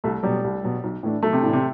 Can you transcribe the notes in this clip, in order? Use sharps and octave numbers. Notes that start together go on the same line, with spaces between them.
C2 A3
B2 F#3 G3
C2
B2 F#3
B1
A2 E3 A3 D4
B1 A3
C3
A2 E3 A3 D4
C3